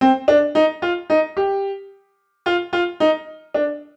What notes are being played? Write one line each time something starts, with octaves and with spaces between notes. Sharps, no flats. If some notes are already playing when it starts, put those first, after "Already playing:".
C4
D4
D#4
F4
D#4
G4
F4
F4
D#4
D4